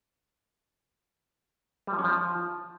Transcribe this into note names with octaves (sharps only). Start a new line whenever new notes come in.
G3
F3
C#4
F3